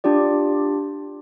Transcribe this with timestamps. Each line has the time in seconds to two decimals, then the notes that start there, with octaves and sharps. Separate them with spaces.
0.04 D4 F4 G4 D5